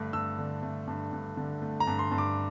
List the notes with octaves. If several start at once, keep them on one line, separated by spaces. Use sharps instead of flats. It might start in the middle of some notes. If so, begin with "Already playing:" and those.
Already playing: G2 D3 A3
G2 E6
D3
A3
G2
G2
D3
A3
A#5
G2
C6
G2
D6